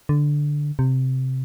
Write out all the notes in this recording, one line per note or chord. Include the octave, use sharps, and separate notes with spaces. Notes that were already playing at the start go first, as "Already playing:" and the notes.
D3
C3